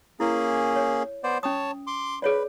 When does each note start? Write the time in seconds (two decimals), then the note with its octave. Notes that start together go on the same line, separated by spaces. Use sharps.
0.20 A#3 C#4 E4 G#4
0.76 C#5
1.24 B3 C5 D5
1.43 C#4 C#5 A5 D#6
1.87 C6 D6
2.22 G#4 B4 C#5 D5